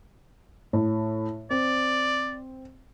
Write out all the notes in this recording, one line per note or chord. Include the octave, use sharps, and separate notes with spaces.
A2
C4 D5